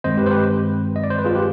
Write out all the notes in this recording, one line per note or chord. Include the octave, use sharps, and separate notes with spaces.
G2 D#3 G#3 C4 C5 D#5
G4 B4
C5
G4 B4
D#5
D5
C5
B4
F4 G#4
G4 B4